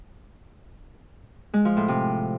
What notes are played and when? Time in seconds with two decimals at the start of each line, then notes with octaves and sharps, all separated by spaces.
1.54 G#3
1.65 F3
1.77 A2
1.88 C3